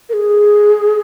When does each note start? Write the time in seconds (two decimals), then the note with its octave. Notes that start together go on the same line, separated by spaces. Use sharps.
0.09 A#4
0.13 G#4